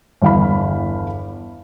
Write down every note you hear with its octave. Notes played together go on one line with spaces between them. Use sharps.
G1 E2 F5 B5